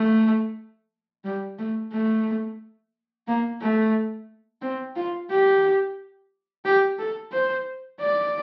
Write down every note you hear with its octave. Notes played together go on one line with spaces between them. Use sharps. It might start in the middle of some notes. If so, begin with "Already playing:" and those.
Already playing: A3
G3
A3
A3
A#3
A3
C4
F4
G4
G4
A4
C5
D5